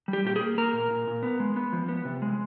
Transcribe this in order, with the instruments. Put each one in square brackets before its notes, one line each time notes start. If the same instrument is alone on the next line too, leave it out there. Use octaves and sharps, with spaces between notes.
[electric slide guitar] G3
G4
A#2 G4
G#4
A#3
A#3 A#4
A#2
A#2
A#2
B3
G#3
B3
F3
B3
C3
G#3